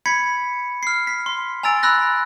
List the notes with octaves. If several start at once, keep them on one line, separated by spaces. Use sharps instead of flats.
B5 G#6 B6 C#7
F6 C7
B6
C6
G#5 A#5 E6 A6 D7
B5 E6 F#6 A#6